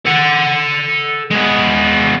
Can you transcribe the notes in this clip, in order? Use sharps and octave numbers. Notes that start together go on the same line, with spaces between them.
A4 F#5
G#3 B3